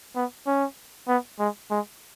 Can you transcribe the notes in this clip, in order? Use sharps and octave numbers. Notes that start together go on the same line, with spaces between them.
B3
C#4
B3
G#3
G#3